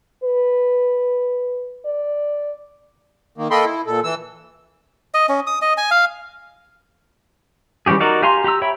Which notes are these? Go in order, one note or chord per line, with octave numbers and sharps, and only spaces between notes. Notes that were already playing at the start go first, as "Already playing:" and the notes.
B4
D5
D#3 A#3
A#3 A4 D#5 G5 B5 C6
E4
A#2 A4
E3 E6
D#5
C#4
D#6
D#5
G#5
F5
E3 G3 C#4 G4 G#4
D#4 F#4 A#4 D5
G4 F5 G#5 A#5 C6
G4 A#5 B5 E6
C#5 E5 G5 B5